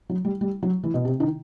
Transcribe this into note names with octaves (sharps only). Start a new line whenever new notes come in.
F#3
G3
G3
F#3
E3
B2
C3
D#3